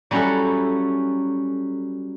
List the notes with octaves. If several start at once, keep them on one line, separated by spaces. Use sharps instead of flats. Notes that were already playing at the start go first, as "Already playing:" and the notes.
F#3 G3 C#4 E4 F#4 A4